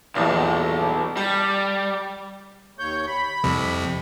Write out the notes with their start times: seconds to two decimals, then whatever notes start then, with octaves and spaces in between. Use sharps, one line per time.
0.16 B1 E2 G2 A#2
1.17 G3 A4
2.79 D#2 C#5 G6
3.07 B5
3.43 C2 F2 C3